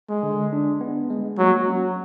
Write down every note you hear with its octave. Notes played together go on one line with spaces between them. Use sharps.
G#3
D3
D4
B3
G#3
F#3 A#3
C#4